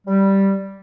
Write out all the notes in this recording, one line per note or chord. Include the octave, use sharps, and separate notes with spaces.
G3